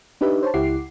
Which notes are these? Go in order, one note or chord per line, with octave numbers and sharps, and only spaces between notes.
D4 D#4 G4 B4 D5 E5
C5 C#5 A5
C#2 E4 G4 F#5 D6 C7